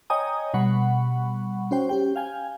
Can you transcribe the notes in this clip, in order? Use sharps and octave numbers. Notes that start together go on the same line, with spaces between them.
C#5 D#5 G5 G#5 A#5 D#6
B2 G3 F#5 B5 C#6
C#4 F#4 C5 G5
C#4 G4 G5
F5 G5 G#5